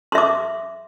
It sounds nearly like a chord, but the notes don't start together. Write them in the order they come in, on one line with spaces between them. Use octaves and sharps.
C6 E5 D6